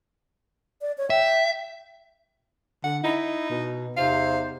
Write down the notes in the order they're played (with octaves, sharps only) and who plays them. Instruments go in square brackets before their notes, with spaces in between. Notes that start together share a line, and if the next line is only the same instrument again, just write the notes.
[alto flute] D5
C#5
[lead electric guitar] E5 [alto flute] G5
[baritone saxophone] D3 [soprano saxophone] F#5
[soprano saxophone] D#4 [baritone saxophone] E4
[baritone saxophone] B2
[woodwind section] E2 C3 C5 [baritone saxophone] D#4 [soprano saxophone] F5